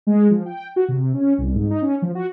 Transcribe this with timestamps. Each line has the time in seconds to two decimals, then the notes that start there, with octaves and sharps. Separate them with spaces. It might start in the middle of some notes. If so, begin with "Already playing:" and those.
0.07 G#3
0.30 F3
0.46 G5
0.76 F#4
0.88 C3
1.14 C#4
1.38 C2
1.55 G#2
1.70 D#4
1.82 C#4
2.02 F3
2.15 F#4